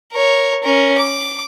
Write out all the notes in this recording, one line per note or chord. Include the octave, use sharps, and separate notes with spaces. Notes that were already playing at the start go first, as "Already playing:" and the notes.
A#4 C#5
C#4 A#4
D6